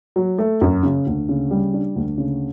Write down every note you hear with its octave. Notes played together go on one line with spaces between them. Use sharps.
F#3
A3
F#2
C#3
D2
C#3
G3
D4
D2
C#3